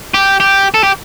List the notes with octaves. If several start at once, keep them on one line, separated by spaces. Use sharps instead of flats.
G4
G4
A4
G4